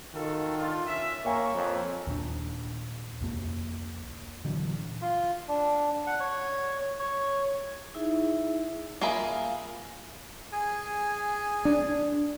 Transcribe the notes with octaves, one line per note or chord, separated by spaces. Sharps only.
D#3 F4 F#4 A4
D4 F4
C#4 E5
A#3 C#5 G#5 A#5 C#6
F2
D#2 A#2 D4
C2 F2 A#3
A#2 D3 E3 F#3
F4
D4
F#5
C#5
C#5
D#4 E4 G#4 E5
A#3 F4 G#4 E5 B5
G#4 G#5
D4